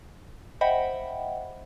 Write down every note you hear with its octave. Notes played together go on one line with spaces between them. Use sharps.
C5 D#5 E5 F#5 G5 B5